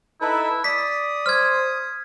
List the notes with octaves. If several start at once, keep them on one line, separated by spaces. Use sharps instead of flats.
D#4 E4 A4 B4
D5 D#6 B6
C5 F6 G#6